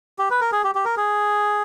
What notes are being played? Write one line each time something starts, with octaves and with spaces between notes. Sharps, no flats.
G4
B4
A#4
G#4
G4
G4
A#4
G#4